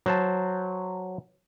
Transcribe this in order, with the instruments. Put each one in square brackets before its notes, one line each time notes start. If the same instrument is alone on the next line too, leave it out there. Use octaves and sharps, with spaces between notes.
[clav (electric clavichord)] F#3 C5 A5